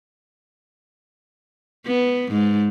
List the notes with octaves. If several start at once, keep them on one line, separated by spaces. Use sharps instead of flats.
B3
G#2